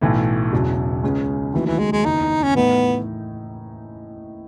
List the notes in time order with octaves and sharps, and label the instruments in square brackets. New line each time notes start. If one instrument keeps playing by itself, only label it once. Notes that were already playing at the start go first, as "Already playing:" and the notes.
[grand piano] B1 A2 E3 A3
E1 E2 C#3 F#3
C#2 C#3 G#3 C#4
[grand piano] D#2 D#3 F#3 A3 [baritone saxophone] E3
[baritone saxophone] E3
G#3
G#3
[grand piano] F#1 E2 D#3 [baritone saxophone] D#4
[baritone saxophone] C#4
[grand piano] A2 E3 A3 D#4 [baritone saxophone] B3